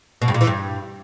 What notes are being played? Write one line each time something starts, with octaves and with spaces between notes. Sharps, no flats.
B2
G2
A#2
E3
G2